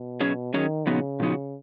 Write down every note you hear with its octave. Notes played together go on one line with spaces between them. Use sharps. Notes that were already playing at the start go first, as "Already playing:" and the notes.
Already playing: B2
F#3 C#4 G#4 C#5
D#3 F#3 C#4 G#4 C#5
A#2 C#3 F3 B3 D#4 F#4
A#2 F3 B3 D#4 F#4